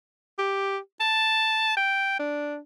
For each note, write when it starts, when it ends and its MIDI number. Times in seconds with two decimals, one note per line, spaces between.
0.39 0.78 67
1.00 1.72 81
1.77 2.19 79
2.20 2.58 62